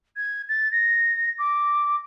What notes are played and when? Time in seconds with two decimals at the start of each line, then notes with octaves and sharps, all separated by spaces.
0.17 G#6
0.49 A6
0.72 A#6
1.38 D6